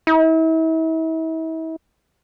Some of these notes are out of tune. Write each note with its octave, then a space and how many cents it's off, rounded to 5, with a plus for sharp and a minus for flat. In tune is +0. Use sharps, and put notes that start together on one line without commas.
E4 -40